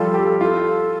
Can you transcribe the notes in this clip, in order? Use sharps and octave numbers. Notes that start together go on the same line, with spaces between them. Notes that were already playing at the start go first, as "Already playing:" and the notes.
Already playing: F3 G3 F4 A4
G4
F4 A4